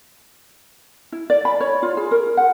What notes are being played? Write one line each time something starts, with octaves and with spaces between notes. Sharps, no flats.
E4
D5
B5
C#5
F4
G#4
A#4
F#5